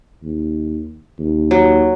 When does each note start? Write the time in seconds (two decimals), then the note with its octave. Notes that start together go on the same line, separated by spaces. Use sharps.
0.23 D#2
1.19 D#2
1.51 F#3